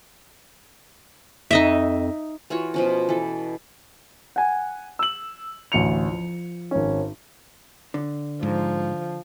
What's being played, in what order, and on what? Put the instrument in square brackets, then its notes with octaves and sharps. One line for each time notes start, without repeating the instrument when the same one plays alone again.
[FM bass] F2 [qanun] D#4 D#5 E5
[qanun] E3 F4 F#4 C#5
B2 F3 C#4
E3 A4
[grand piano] F#5 G#5
E6 F#7
A1 D2 C#7 F7
F3
G#1 C#4
[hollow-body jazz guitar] D3
[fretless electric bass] G#2 [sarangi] F3